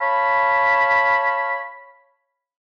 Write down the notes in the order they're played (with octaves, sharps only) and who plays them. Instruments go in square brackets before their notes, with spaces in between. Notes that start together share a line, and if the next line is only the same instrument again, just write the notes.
[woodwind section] C#5 F5 A5 B5